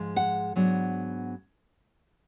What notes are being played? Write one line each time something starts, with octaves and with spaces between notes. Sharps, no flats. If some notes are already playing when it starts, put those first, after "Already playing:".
Already playing: G#2 F3 G#3
F#5
G#2 F#3 B3 D4